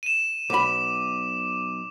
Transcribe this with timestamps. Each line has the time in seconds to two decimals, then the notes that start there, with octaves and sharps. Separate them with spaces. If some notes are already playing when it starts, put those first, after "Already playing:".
0.03 D#7 E7
0.50 B1 B5 D6